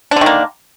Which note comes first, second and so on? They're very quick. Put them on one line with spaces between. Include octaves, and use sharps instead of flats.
D4 D3 D#3 A#3